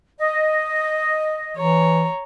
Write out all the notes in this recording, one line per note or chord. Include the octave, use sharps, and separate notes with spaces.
D#5
E3 C#5 A#5